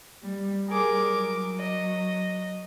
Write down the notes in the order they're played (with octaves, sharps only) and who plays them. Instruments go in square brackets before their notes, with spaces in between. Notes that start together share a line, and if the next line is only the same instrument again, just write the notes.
[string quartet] G3
[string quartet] G3 G#4 [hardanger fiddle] A#4 D6
[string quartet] F#3
[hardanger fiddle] D#5